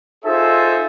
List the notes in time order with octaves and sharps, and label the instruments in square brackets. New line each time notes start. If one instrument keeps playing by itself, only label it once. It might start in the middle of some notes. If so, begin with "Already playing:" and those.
[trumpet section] D#4 F4 G#4 A4 C5 E5